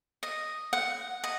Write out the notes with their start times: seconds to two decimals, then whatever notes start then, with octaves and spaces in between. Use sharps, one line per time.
0.23 D#5
0.73 F#5
1.24 D#5